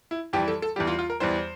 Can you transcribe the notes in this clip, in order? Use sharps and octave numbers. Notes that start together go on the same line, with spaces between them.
E4
F2 E3 G3 G4
A4
A4
E2 E3 G3 G4
F4
F4
A#4
E2 E3 G3 C5